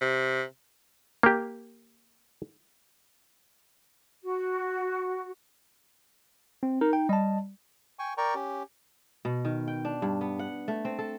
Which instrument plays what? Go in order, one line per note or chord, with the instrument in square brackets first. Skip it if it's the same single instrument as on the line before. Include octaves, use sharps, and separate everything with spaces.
[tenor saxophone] C3
[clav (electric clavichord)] A#3 G4
[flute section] F#4
[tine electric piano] C4
[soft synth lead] D#4 [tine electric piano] A#4
[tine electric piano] G5
[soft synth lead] G3 [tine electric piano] D#5 A5
[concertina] G5 G#5 C#6
A#4 D5 G5 A#5 C#6
C#4 G4
[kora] B2
D#3
G5
D4
G2
B3
F#5
A3
C4
A4